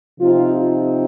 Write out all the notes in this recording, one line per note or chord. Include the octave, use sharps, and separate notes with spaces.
C3 F3 C4 D#4 F4